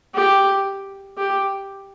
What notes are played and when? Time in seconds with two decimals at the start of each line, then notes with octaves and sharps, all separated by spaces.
0.15 G4
1.17 G4